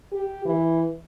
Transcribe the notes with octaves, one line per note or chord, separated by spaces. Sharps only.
G4
E3